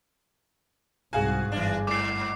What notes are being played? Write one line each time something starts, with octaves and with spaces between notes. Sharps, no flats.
C2 G#2 F#4 G#4 F5 G#5
G1 E3 D4
G#2 D6 C7